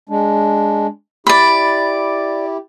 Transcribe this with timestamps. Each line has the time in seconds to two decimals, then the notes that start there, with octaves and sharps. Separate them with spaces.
0.09 G#3 D4
1.27 E4 G4 D5 B5